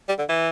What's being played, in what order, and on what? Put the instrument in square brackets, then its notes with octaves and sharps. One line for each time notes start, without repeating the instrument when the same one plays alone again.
[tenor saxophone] G3
D3
E3